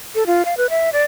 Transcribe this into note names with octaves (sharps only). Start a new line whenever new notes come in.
A4
F4
F5
B4
E5
D5